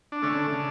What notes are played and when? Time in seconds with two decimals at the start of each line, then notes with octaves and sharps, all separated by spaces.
0.12 D4
0.22 D3 A3 C#4
0.32 D4
0.52 C#3